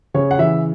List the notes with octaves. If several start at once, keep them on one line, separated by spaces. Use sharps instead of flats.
C#3 C#5
F#5
E3 E5